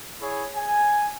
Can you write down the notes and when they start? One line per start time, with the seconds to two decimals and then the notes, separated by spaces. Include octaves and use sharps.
0.21 E4 G#4 C#5
0.55 G#5